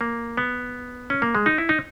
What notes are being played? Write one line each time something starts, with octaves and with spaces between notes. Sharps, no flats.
A#3
B3
C#4
A#3
G#3
D#4
E4
D#4